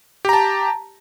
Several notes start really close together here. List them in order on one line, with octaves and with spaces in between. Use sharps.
G4 A#5 A5